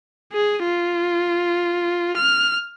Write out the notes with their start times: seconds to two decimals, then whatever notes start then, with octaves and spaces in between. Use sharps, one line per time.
0.33 G#4
0.64 F4
2.17 F6